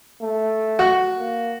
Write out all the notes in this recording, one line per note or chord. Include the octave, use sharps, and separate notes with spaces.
A3
F#4
A#3